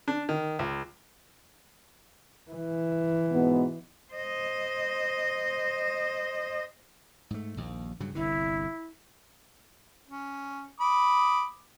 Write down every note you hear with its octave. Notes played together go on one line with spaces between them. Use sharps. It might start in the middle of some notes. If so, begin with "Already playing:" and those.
D4
D#3
C#2
E3
G#2 B2 B3
C5 D#5
G#2 A3
A#1 D#2
G2 C#3 F#3
G1 C2 D3 E4
C#4
B5 D6 D#6